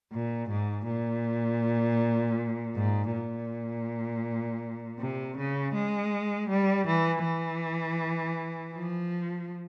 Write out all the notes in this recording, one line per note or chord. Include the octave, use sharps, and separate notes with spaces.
A#2
G#2
A#2
G#2
A#2
C3
C#3
G#3
G3
E3
E3
F3